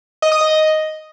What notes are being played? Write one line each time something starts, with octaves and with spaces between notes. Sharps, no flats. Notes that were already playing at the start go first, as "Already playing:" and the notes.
D#5
D#6
D#5